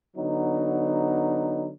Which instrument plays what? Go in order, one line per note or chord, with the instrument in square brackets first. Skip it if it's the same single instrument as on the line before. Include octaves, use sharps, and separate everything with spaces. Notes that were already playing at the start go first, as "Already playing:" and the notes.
[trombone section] D3 F#3 B3 D#4